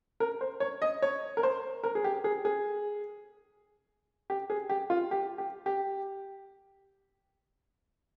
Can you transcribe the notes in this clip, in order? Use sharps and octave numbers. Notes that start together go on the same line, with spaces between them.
A#4
C5
C#5
D#5
C#5
A#4
C5
A#4
G#4
G4
G#4
G#4
G4
G#4
G4
F4
G4
G4
G4